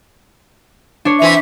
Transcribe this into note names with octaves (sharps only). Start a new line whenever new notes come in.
D4 C#5
E3 C4 E5